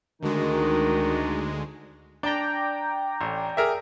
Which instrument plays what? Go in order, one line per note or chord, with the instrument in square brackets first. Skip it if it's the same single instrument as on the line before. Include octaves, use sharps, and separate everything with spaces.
[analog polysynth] D2 G#3 [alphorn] D#3 [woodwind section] D4 D#4 F#4
[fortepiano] D4 [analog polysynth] D5 G5 A#5
[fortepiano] A1
G#4 A#4 E5